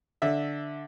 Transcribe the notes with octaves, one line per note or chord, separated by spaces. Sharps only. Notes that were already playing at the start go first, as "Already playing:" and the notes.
D3 E5